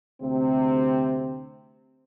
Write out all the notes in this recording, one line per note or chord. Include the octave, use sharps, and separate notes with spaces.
D2 C3 C4